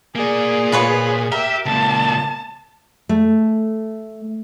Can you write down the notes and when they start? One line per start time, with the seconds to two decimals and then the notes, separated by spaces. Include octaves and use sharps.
0.15 A#3 G#4 D5
0.72 A#2 F4 B4 C#5
1.32 G4 A#4 E5
1.66 C#2 A#2 A5
3.09 A3